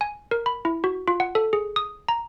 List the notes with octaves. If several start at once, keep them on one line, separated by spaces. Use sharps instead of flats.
G#5
A#4
B5
E4
F#4
F4
F#5
A4
G#4
D#6
A#5